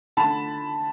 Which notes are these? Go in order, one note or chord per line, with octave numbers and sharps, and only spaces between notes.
D3 A5 B5